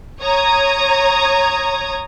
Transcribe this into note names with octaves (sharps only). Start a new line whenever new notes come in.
C#5 A#5 D#6 G#6